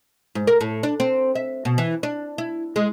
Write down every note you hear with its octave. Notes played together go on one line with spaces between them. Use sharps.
G#2
A#4
A2
D4
C4
E5
B2
E3
D4
E4
G#3